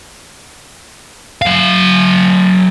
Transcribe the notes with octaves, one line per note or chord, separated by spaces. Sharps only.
F#3 F5